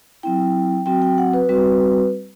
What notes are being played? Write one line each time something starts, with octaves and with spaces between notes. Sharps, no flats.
F#3 C4 E4 G5
F#3 C4 F#4 G5
G5
F#5
B4
G3 C4 F#4 B4